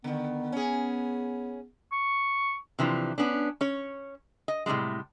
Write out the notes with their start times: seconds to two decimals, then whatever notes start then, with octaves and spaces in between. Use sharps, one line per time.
0.04 D3 D#3 B3
0.52 C#4 G#4
1.92 C#6
2.79 C3 E3 F3 D4
3.18 B3 C#4 D4
3.61 C#4 C#5
4.48 D#5
4.66 A2 C3 E3 G3 G#3